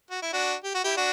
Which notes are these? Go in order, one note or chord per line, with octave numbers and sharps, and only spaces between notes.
F#4
E4
D4 F#4
G4
F#4
E4 G4
D4 F#4